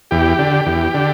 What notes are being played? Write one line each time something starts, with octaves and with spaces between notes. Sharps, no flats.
E2 G4
D3
E2
D3